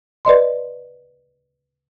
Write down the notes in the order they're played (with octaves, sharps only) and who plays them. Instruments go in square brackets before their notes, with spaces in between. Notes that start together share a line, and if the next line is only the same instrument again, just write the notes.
[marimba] B4 D5 D#5 C6